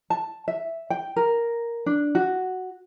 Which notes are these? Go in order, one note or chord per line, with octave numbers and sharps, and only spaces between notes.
A5
E5
G5
A#4
D4
F#4